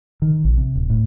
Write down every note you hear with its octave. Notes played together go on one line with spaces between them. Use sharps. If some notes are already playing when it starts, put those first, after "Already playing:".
D#3
A#1
C3
D1
A2